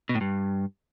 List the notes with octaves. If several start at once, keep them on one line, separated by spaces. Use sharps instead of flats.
B2
A2
G2